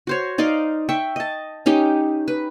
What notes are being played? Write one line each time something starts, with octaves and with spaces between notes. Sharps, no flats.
F#4 C5 C#5
D#4 D5 D#5 F5
E5 G5 C#6
D#5 A5
C#4 D#4 G4
B4